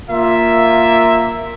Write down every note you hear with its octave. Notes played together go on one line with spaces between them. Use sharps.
A#3 F4 E5